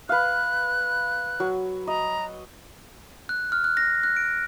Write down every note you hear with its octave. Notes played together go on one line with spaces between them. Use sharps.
B4 F5 F#6
F#3
D#5 A#5
F#6
F6
F#6
A#6
F#6
D7